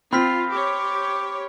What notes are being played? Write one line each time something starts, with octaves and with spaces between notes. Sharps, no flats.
C4 F4 B5 F6 B6
G4 C#5 D6